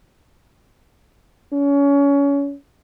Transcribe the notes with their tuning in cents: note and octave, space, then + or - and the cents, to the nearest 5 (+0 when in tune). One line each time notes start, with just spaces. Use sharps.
C#4 +25